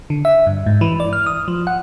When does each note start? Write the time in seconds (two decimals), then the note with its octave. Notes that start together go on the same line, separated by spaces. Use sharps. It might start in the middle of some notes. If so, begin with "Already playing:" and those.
0.10 D3
0.25 E5
0.46 G2
0.66 G#2
0.81 E3
1.00 D5
1.13 F6
1.26 D#6
1.48 F3
1.67 F#5